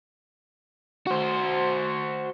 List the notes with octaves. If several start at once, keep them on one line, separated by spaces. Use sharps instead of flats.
F#4 C5